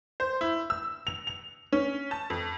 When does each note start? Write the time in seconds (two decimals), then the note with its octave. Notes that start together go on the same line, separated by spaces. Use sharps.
0.20 C5
0.41 E4
0.70 E6
1.07 F7
1.27 F7
1.73 C#4
2.11 A5
2.30 F2